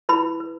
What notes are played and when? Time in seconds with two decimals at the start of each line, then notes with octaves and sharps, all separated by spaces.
0.09 E4 B4 B5
0.40 B4